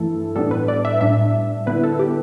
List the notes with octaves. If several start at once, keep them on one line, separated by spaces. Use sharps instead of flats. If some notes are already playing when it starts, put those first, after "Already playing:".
Already playing: G2 E3 A3 E4 A4
A2 G3 B3 D4 A4
B4
D5
E5
A2 G3 D4 E5
D3 B3 E4 B4
A4
G4